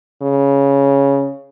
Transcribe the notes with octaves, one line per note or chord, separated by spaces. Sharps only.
C#3